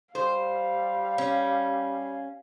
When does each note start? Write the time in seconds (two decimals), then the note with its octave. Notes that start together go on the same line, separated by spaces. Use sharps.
0.15 G3 C5 F5
1.18 C#4